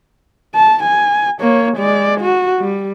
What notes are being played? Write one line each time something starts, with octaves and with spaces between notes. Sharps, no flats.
A5
G#5
A#3 C#5
G#3 D5
F#4
G3